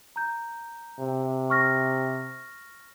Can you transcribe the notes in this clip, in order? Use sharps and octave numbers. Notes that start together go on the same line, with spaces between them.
A#5 G6
C3
C#6 F6 A#6